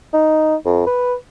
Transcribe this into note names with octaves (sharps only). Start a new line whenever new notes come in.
D#4
F2
B4